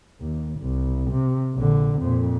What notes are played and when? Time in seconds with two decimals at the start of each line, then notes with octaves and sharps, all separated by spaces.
0.21 D#2
0.60 C2
1.11 C3
1.54 A#1 D3
1.99 F2 A#2